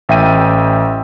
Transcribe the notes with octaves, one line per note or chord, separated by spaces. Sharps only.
A1 E5 G5 D#7